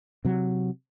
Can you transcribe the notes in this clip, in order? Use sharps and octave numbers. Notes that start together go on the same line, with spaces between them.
C3 F#3